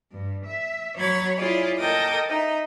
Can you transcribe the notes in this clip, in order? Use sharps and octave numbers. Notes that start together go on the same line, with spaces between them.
G2
E5
F#3 C#5 B5 G#6 A6
E4 F4 G#4 C#5 D5
A4 A#4 D#5 G5 D6 D#6
D#4 E5